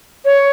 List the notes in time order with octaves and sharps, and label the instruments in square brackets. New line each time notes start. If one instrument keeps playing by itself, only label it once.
[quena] C#5